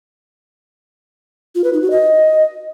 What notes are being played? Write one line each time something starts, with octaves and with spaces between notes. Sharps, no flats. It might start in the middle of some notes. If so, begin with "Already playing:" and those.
F4
B4
D#4
F#4
D#5